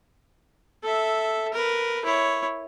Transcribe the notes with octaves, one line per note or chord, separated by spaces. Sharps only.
A4 E5
A#4 B4
E4 C#5